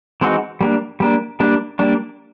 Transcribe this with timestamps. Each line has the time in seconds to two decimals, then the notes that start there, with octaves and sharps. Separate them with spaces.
0.21 E3 G#3 C4 D#4 F#4
0.61 G3 A#3 D4
1.00 G3 A#3 D4
1.40 G3 A#3 D4
1.79 G3 A#3 D4